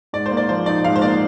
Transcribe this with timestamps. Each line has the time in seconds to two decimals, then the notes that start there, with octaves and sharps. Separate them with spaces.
0.13 G#2 D5
0.26 C5
0.31 A#3
0.37 D5
0.49 F3 C5
0.66 D#4 D5
0.84 G#2 F5
0.96 C5
1.02 A#3 D5